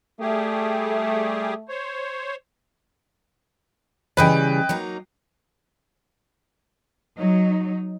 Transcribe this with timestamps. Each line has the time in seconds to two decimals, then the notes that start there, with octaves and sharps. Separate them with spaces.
0.21 G3 A3 G4 G#4
1.69 C5 C#5
4.17 C#3 E3 G3 B4 D#5 G5
4.69 F#3 A#3 D#4
7.18 F#3 D#4